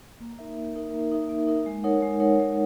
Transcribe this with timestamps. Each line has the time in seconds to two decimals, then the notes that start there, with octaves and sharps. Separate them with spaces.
0.20 A#3
0.39 D#4 A#4 E5
0.57 A#3
0.76 D#4 A#4 E5
0.94 A#3
1.12 D#4 A#4 E5
1.29 A#3
1.47 D#4 A#4 E5
1.66 G#3
1.84 D#4 A#4 C#5 F#5
2.02 G#3
2.20 D#4 A#4 C#5 F#5
2.39 G#3